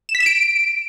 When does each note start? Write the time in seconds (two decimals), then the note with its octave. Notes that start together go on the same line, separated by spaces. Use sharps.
0.09 E7
0.15 B6
0.20 E7
0.26 D7